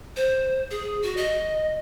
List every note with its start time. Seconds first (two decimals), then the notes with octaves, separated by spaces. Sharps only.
0.16 C5
0.71 G#4
1.02 F#4
1.17 D#5